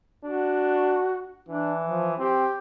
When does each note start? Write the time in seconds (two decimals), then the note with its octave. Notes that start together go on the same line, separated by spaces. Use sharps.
0.25 D4 F#4
1.49 E3 D4
1.85 F3
2.18 C4 G4